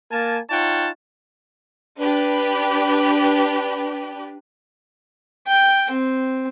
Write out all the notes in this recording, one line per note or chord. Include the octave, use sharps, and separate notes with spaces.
A#3 A#4 G#5 A5
D#4 F4 C#5 F#5 G5 A5
D4 G4 B4
G5
C4